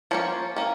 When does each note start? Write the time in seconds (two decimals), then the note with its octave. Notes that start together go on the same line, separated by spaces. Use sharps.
0.11 F3 A#3 C#4 C#5
0.56 A#3 C#4